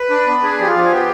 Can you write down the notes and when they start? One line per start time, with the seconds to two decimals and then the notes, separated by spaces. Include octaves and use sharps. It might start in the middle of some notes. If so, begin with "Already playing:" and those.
Already playing: B4
0.10 D4
0.26 B3
0.42 D4 G#4
0.59 F3 G4
0.67 F4
0.75 F3
0.85 G#4
0.91 B3 G4